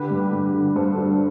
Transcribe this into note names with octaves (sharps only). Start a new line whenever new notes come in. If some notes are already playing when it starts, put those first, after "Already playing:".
Already playing: D3 G4 B4
G2
G2
D3
G2 A4 C5
G3